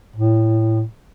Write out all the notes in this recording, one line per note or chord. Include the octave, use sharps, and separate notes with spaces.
A2